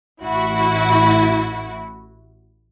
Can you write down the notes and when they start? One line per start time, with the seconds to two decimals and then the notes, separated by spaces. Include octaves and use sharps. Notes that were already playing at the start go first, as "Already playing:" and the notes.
0.22 A1 E4 F#4